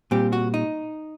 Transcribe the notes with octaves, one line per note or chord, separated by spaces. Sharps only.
A#2 G3 C4 G4
F#4
D#4